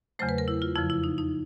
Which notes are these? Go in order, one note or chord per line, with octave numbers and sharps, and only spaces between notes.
E2 C#3 F#3 A3 C5
B4
A#4
E4
F4
F2 C#3 F3 E4
E4
D#4
D#4